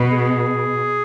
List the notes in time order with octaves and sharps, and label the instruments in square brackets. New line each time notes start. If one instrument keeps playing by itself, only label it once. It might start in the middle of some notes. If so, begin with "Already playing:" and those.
Already playing: [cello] B2
[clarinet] G#4